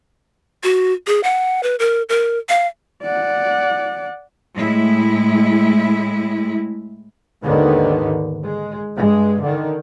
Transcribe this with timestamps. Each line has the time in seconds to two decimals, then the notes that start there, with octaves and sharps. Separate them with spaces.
0.64 F#4
1.07 G#4
1.24 F#5
1.63 B4
1.79 A#4
2.09 A#4
2.49 F5
3.03 D5 F#5
4.57 A2 G#3 E4
7.42 D#2 G#2 D3 D#3 B3
8.43 G#3
8.96 G2 G#3
9.41 D3 D#3